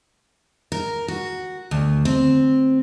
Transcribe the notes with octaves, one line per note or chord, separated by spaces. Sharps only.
A#4
F#4
D2
C4